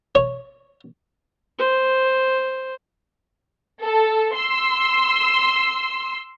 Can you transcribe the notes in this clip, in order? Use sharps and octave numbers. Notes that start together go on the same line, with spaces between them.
C#5
C5
A4
C6 E6